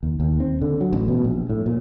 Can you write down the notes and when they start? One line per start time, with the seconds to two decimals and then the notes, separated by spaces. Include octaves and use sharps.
0.03 D#2
0.20 D#2
0.40 C4
0.62 D3
0.80 F#3
0.93 A1
1.08 B2
1.24 A#1
1.50 A2
1.66 A#2